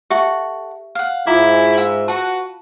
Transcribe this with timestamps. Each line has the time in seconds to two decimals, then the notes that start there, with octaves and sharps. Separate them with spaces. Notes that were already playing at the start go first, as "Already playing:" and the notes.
0.10 G4 A4 E5 F#5 C#6
0.95 F5 F#5
1.27 G#2 E4 F4 A#5 D6
1.78 E5 F5
2.08 F#4 B4 F#5 A5